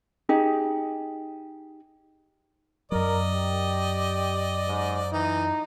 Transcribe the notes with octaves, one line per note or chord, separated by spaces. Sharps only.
D#4 G4 G#4
F#2 F#3 A#4 D5 D#5
G4
G#2
E3 D#4